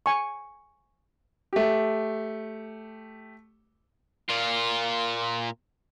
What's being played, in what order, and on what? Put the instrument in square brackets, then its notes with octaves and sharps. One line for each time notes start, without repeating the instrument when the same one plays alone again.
[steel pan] G#5 C#6
[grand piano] A3 G4
[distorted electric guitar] A#2 F4